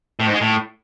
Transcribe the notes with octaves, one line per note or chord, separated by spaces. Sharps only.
A2
G#2
G#3
A2